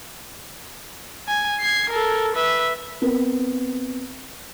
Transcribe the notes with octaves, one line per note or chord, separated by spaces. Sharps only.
G#5
G#6 C7
A4 A#4
B4 E5
B3 C4 A#4